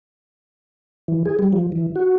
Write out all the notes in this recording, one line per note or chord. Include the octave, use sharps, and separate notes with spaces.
E3
G#4
G3
F3
E3
F#4